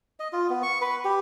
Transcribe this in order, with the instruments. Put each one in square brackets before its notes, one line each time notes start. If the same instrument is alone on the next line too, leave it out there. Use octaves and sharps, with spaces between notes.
[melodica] D#5
F4
B3
C#6
B4
G4